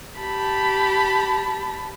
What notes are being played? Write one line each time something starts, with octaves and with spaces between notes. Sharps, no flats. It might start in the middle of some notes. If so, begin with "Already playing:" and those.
G4 A5 B5